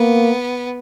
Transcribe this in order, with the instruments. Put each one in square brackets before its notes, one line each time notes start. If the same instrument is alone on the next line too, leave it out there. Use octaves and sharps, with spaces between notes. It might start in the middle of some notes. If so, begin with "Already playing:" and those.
Already playing: [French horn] A#3 [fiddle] B3